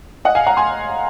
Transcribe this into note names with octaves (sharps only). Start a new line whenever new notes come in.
D#5 F#5
F5 G#5
F#5 A#5
G#5 C6